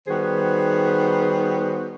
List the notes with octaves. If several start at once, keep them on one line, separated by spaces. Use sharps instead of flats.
D#3 G3 B3 F#4 G#4 C5